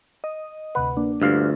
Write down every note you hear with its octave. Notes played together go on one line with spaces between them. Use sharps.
D#5
D2 C3 B4 F#5
A#3 D4
D2 G2 F4 F5